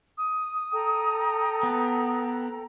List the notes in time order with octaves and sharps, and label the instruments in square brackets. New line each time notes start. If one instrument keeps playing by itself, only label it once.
[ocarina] D#6
[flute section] A4 G5 A#5
[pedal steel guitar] B3